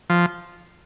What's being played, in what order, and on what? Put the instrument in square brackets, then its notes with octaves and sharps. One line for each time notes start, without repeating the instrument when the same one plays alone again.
[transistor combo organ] F3